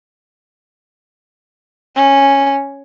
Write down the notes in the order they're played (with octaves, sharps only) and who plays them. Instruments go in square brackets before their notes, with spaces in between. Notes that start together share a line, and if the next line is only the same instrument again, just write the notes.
[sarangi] C#4